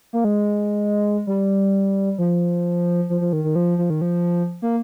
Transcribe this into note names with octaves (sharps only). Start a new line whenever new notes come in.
A#3
G#3
G3
F3
F3
F3
D#3
D#3
F3
F3
D#3
F3
A#3